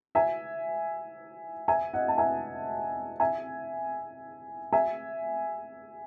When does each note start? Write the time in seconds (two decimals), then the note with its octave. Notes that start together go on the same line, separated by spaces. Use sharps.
0.15 E5 G#5
1.68 E5 G#5
1.93 D#5 F#5
2.08 A5
2.18 E5 G#5
3.20 E5 G#5
4.73 E5 G#5